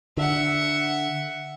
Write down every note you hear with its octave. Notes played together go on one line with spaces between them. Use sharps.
D3 E5 F#5